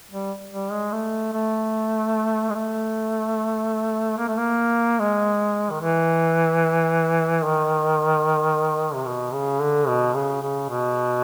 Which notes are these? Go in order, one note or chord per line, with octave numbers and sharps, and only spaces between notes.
G3
G3
G#3
A3
A3
G#3
A3
A#3
A3
A#3
G#3
D#3
E3
D#3
C3
B2
C#3
D3
B2
C#3
C#3
B2